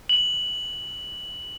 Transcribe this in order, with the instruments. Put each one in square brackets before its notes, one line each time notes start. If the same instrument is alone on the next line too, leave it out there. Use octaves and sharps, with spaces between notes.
[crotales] F#7